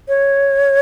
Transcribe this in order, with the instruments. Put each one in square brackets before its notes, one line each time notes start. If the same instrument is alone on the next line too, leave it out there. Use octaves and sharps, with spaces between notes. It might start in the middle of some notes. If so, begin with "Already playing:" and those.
[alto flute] C#5